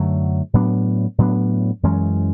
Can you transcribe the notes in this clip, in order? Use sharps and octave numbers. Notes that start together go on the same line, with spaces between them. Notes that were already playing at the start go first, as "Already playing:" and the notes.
Already playing: F#2 D3 F#3 A3
A2 F#3 B3 D4
A2 F#3 B3 D4
F#2 E3 G#3 C#4